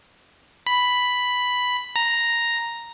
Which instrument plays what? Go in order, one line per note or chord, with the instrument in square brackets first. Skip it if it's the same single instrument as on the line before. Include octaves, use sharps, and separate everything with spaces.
[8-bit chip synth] B5
A#5